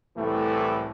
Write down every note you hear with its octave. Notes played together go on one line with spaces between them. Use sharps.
C2 A2 E3 A3